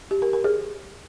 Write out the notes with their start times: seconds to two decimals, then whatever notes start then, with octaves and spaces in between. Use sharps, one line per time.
0.11 G4
0.22 A#4
0.33 A#4
0.44 G#4